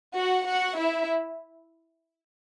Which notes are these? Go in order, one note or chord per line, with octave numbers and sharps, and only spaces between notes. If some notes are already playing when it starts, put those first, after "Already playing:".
F#4 F#5
F#4 F#5
E4 E5